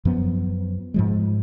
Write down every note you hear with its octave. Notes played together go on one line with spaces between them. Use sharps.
F#2 F3 B3
G#2 F3 G#3